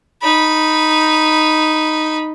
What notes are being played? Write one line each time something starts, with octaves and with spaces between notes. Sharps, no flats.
D#4 B5